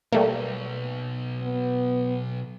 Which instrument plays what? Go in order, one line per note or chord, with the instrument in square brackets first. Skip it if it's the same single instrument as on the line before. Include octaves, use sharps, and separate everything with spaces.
[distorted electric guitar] B1 [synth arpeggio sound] G3 A3 A#3
[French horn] B3